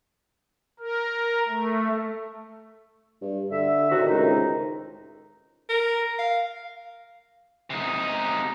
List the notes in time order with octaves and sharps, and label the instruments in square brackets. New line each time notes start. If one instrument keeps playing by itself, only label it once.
[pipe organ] A#4
A3
[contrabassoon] G2
[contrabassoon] D3 [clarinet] E5
[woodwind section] A2 C3 D#3 [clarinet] F#4
[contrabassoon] C#2 [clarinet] D#4
[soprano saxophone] A#4
F5
[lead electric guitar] C3 D#4